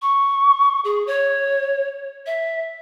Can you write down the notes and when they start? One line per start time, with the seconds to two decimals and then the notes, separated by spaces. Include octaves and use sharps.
0.02 C#6
0.85 G#4
1.07 C#5
2.26 E5